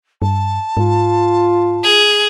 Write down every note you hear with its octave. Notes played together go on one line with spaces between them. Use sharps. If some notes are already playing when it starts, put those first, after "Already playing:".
G2 A5
G#2 F4
G#4